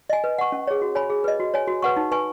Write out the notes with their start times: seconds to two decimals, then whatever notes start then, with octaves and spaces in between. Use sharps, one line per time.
0.10 D#5 G#5
0.24 B4
0.38 F#5 C#6
0.52 C#4
0.67 G#4 C#5
0.82 F#4
0.95 C#5 G#5 B5
1.10 G#4
1.24 B4 D#5
1.40 F#4
1.54 C#5 G#5
1.68 F#4
1.82 B4 F#5 C#6
1.97 D#4
2.11 B4 G#5 C#6